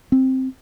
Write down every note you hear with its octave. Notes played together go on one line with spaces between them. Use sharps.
C4